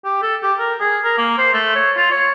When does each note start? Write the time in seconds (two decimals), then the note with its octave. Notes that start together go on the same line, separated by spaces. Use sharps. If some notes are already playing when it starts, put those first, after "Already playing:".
0.05 G4
0.22 A4
0.43 G4
0.59 A#4
0.80 G#4
1.04 A#4
1.18 A#3
1.38 C5
1.54 A3
1.75 C#5
1.97 F4
2.11 C#5